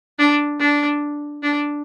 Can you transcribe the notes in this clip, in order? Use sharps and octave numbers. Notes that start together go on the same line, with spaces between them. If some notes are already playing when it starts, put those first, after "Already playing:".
D4
D4
D4